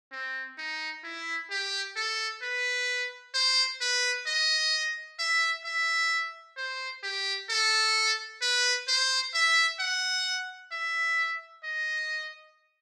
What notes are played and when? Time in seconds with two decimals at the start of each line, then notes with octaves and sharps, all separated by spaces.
0.12 C4
0.58 D#4
1.04 E4
1.50 G4
1.96 A4
2.42 B4
3.34 C5
3.81 B4
4.27 D#5
5.19 E5
5.65 E5
6.57 C5
7.03 G4
7.49 A4
8.42 B4
8.88 C5
9.34 E5
9.79 F#5
10.72 E5
11.64 D#5